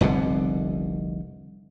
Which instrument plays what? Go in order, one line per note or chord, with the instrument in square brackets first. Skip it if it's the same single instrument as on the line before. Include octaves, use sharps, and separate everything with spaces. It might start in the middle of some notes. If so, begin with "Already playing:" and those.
[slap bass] F1 C2 B2 D3